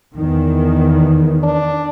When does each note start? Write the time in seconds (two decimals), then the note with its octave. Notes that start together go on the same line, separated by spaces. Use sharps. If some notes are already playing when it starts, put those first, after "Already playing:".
0.15 E2 D#3
1.43 D4